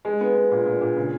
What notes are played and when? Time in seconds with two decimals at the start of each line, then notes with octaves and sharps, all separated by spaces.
0.05 G#3
0.21 B3
0.36 B3
0.51 A#2
0.66 A#2
0.81 A#2
0.96 C#3